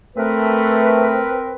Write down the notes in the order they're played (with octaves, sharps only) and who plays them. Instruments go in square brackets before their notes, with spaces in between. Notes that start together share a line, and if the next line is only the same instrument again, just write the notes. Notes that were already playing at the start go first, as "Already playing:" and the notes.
[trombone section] A3 [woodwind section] C4 A#4 B4